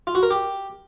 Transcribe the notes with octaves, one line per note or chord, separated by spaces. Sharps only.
F4
F#4
A#4
G4